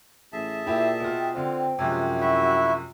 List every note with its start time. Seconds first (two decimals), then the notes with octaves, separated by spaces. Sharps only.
0.32 A1 G#4 E5 A5
0.66 A#2 E4 G4 G5
1.00 B2 F4
1.35 D3 C4 F4
1.79 F#2 C3 F3 G#3 G4 C#5
2.20 E4 F#4 E5